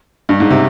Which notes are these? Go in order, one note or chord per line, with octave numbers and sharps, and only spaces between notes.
G2
G#2
C3